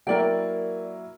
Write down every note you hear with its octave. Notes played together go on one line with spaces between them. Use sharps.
F#3 A#3 E4 A#4 D5 G5